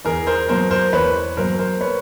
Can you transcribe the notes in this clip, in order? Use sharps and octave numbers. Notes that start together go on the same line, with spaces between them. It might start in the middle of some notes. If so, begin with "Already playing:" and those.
E2 G#4 A#4
A#4 C5
B2 F#3 A#3 A#4 C5
A#4 C5
E2 B4 C#5
B2 F#3 A#3 A#4 C5
A#4 C5
B4 C#5